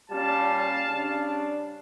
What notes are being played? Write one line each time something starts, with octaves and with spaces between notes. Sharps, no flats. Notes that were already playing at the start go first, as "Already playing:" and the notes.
A#2 G3 C#4 F5 A5
C#3 G3 D4